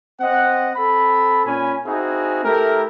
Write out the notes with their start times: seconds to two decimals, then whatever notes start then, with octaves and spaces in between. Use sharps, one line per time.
0.21 C4 D#5 F#5
0.76 C4 A4 B5
1.46 A#2 C#4 G#5 B5
1.86 C4 D#4 E4 F#4 G#4
2.45 A3 E4 G4 A#4